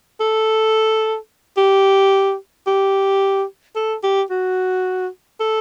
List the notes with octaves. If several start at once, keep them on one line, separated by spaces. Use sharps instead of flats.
A4
G4
G4
A4
G4
F#4
A4